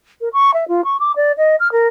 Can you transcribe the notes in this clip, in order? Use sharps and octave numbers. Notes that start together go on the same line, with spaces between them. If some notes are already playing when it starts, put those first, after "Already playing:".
A#4
C#6
E5
F4
C#6
D6
D5
D#5
F6
A#4